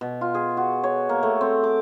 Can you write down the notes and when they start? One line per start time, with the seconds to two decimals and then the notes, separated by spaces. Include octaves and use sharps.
0.01 B2
0.21 F4
0.35 G#4
0.57 F#4
0.84 C#5
1.09 A#3
1.23 A3
1.41 C4
1.64 D6